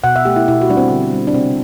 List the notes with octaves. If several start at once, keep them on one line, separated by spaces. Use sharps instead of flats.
B2 F#5
E5
A3 G4
E4
B2 E4
F#4
G3 D4
C4
D3
G3
D4
C3 C4